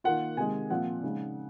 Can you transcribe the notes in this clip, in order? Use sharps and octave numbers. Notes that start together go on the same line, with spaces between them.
D#3 A#3 F4 F#5
C3 D#3 G#3 G#5
A#2 F3 C4 F4 F#5
C#3 G#3 D#4